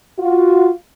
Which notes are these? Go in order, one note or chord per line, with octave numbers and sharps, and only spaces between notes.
F4 F#4